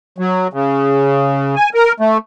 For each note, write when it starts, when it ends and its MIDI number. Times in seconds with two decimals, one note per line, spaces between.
0.18 0.47 54
0.53 1.55 49
1.56 1.69 80
1.74 1.92 70
2.00 2.17 57